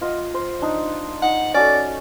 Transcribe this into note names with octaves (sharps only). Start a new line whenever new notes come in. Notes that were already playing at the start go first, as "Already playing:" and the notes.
F4 D#5 F#5
C5
D4 D#4
D#4 F#5
C#4 F#4 A4 D5